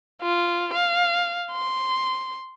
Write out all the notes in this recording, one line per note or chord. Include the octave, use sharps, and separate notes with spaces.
F4
F5
C6